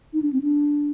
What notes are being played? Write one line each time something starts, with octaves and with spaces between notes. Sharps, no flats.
D#4
D4
C4
D4